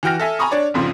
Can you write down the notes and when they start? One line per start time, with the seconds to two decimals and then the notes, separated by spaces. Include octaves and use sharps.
0.03 E3 F#4 G5 F6 A#6
0.20 A4 E5 G#5
0.39 G#5 A#5 B5 C#6 D#6
0.51 D4 C#5 D5
0.74 A#1 F2 G#2 C#3 F3